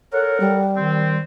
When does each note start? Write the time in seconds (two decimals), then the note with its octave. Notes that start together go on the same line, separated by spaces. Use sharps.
0.13 A4 A#4 C#5 F#5
0.40 G3
0.76 D#3 C4